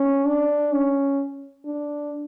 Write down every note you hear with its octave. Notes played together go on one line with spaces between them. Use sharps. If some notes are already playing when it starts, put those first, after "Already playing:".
Already playing: C#4
D4
C#4
D4